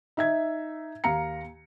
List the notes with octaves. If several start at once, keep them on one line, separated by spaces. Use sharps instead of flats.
D#4 E5 G#6
D#2 F5 A#5 C#7